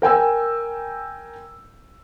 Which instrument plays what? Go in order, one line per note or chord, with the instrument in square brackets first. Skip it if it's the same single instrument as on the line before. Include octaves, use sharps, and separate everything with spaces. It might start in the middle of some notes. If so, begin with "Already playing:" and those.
[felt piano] A#4 G5 G#5 E6